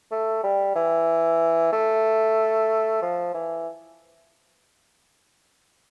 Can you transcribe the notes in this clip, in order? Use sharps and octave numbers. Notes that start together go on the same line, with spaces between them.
A3
G3
E3
A3
F3
E3